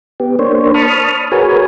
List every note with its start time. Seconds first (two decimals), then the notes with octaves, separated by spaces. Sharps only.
0.20 B3 G4
0.39 A#3 D4 C5 C#5
0.74 A5 B5 C#6 D#6 F6
1.32 F#4 G#4 A#4 B4 C#5 G#5